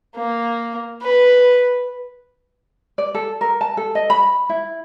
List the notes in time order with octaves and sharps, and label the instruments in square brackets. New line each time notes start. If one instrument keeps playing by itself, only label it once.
[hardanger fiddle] A#3
B4
[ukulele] D5
A4
A#4
A5
A4
D#5
B5
E4